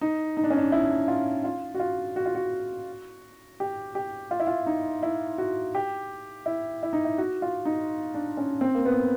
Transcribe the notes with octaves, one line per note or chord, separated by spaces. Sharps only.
D#4
D#4
D4
C#4
D4
E4
F4
F4
F#4
F4
F#4
F4
F#4
G4
G4
F4
E4
F4
D#4
E4
F#4
G4
E4
E4
D#4
E4
F#4
F4
D#4
D4
C#4
C4
A#3
B3